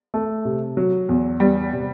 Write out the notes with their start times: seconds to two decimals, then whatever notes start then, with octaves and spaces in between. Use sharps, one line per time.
0.14 A3
0.45 C3
0.77 F#3
1.09 E2
1.40 G3 B3
1.73 C3